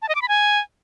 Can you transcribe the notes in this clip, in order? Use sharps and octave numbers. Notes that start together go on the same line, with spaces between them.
A5
D#5
D6
B5
G#5